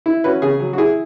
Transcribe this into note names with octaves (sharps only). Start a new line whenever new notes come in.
E4
C#4 F#4 B4
C#3 G#4
F#3
F#4
E4 G#4